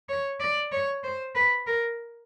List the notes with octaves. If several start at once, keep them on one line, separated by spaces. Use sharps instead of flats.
C#5
D5
C#5
C5
B4
A#4